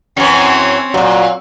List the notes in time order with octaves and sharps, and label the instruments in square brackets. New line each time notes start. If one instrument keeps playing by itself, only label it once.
[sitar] F#2 E3 [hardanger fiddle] C4 C#4
[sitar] G2 A#2 [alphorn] F#3